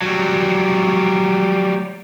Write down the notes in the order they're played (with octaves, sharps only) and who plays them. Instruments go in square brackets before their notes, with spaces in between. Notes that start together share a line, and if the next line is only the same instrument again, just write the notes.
[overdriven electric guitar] F#3 G3